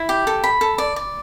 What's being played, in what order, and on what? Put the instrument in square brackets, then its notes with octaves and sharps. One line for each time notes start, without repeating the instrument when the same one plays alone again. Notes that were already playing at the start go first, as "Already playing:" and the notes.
Already playing: [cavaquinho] E4
G4
A4
B5
A4
D5
D5